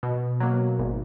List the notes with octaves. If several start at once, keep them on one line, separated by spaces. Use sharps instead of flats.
B2
F#3 A#3
G#1